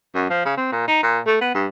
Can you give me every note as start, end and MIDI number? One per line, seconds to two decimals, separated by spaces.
0.14 0.28 42
0.30 0.43 53
0.45 0.56 49
0.57 0.68 60
0.72 0.86 46
0.88 1.01 63
1.03 1.19 46
1.26 1.38 57
1.41 1.54 59
1.55 1.67 43